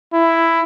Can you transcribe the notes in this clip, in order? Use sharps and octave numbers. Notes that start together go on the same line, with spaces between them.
E4